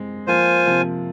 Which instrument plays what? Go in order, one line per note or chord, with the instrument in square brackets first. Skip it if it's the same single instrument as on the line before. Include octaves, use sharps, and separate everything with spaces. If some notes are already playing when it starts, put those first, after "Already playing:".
Already playing: [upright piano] G#3 C4
[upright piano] F3 A#3 [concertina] F4 C5 G#5
[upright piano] C3 F3